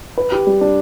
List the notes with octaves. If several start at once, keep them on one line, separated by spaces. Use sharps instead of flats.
B4
G4
G3
D4